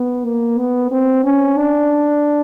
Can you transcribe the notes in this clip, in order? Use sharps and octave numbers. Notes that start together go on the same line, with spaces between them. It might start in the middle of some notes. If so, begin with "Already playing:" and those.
Already playing: B3
A#3
B3
C4
C#4
D4